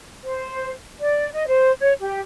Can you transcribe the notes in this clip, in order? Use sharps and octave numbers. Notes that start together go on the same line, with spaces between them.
C5
D5
D#5
C5
C#5
G4